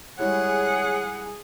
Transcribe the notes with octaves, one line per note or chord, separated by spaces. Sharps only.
G3 G#3 E4 G#4 C#5 F#5